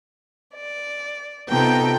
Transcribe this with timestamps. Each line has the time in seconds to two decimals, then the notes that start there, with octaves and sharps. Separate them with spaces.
0.55 D5
1.49 C3 B3 D#4 F4 A4 G5